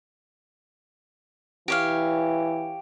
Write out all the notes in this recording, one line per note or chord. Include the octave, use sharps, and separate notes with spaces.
E3 G4 C#5 F5